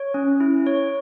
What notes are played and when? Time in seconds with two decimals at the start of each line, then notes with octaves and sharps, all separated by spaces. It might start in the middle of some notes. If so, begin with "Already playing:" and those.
Already playing: C#5
0.14 C#4
0.40 E4
0.66 C#5